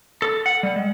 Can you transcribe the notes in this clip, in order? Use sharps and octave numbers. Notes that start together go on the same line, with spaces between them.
A4
F#5
G3
G#3